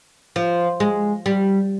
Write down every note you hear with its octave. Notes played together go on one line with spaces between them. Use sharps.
F3
G#3
G3